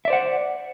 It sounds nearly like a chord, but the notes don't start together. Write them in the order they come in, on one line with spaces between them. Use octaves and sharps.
E5 D5 C5 F#5